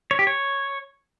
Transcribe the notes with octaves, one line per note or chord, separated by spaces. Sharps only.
C#5
G4
C#5